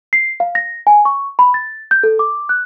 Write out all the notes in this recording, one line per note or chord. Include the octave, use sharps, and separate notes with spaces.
C7
F5
A#6
G#5
C#6
B5
A6
G6
A4
D6
F#6